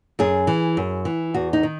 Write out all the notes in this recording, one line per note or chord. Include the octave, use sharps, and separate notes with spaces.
F#2 G#4
E3
F#2
E3
E2 F#4
D#4
D#3